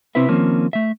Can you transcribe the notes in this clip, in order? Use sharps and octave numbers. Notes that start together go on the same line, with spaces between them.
B1 C3 C4 E4 B4 E5
D#3 F3 A#3 C4 C#4
A3 E5